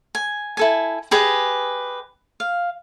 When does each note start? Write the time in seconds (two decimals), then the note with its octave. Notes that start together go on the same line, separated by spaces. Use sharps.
0.15 G#5
0.57 E4 A4 G#5
1.11 G4 G#4 B4 D#5
2.40 F5